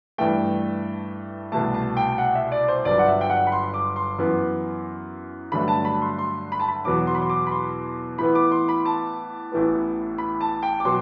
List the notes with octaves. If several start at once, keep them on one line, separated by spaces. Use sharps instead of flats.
G2 E3 A3 G5
C2 B2 A3 A5
A5
G5
F#5
E5
D5
C5
G1 G2 F#3 D5
F#5
E5
G5
F#5
B5
C6
D6
C6
F#2 E3 B3
G2 D3 F#3 A3 B5
A5
B5
C6
C6
B5
A5
B5
E2 B2 F#3 B3 D6
C6
B5
C6
D6
B5
C6
A2 E3 B3 B5
D6
C6
B5
A5
A1 A2 E3 B3
B5
A5
G5
D6
B2 F#3 C6